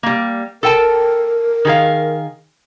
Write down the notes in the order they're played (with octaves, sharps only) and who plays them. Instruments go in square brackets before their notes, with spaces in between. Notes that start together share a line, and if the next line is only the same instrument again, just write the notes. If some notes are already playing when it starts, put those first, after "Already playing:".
[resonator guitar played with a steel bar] G3 A#3
[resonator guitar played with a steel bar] A4 G5 A5 [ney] A#4
[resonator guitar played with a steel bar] D#3 G#4 F5